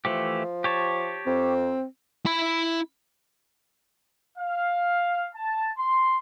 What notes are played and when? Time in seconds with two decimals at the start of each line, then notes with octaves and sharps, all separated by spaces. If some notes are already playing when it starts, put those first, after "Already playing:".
0.05 E3 F3 A3 G4
0.64 G4 C#5 A5
1.27 F2 C4
2.26 E4 B5
4.38 F5
5.35 A5
5.77 C6